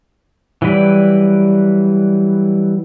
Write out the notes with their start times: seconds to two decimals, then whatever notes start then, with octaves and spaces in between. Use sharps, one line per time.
0.62 E3 F#3 G3 B4 D5